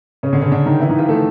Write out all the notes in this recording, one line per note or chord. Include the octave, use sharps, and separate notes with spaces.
C#3 C#4
D3 D4
C#3 C#4
D3 D4
D#3 D#4
E3 E4
D#3 D#4
F3 F4
A3 A4